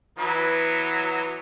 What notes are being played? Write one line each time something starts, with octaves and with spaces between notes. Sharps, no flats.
E3 F#3 B3